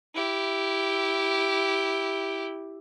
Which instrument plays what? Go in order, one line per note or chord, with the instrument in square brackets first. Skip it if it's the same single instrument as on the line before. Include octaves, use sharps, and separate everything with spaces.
[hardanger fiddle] E4 G4